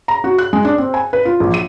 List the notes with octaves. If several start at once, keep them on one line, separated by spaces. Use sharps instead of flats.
A#5
F#4
F#6
G#3
D4
C4
G#5
B4
F4
A#1
D#7